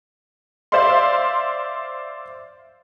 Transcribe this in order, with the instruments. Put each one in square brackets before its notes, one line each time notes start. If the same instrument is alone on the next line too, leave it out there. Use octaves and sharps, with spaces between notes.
[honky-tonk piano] C5 D5 E5 F5 C6